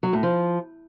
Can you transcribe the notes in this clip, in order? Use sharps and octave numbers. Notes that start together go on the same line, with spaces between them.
F#3
A2
F3